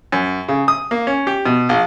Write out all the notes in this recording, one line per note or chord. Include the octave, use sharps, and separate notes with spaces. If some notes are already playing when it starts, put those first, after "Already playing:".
F#2
C#3
D#6
A#3
C#4
G4
B2
A#1